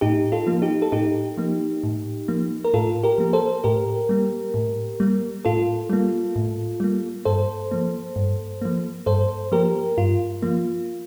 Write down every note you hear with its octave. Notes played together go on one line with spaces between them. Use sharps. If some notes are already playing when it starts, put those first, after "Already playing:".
A2 D#4 G4
F4 A4
F3 A#3
D#4 G4
A4
A2 D#4 G4
F3 A#3
A2
F3 A#3
A#4
A2 F4 A4
G4 A#4
F3 A#3
A4 C5
A2 G4 A#4
G3 A#3
A2
G3 A#3
A2 F4 A4
G3 A#3
A2
G3 A#3
G2 A4 C5
F3 A#3
G2
F3 A#3
G2 A4 C5
F3 A#3 G4 A#4
G2 F4
F3 A#3